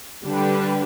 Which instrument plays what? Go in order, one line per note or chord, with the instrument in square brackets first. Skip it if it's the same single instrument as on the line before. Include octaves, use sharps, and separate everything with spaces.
[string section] D3 G3 D4 G4 B4